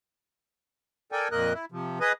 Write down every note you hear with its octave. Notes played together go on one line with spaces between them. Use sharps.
A4 A#4 D5 G5 G#5
F2 A#2 A#3 A#4 D#5 F#6
E4
C3 F3
G#4 B4 D#5 D#6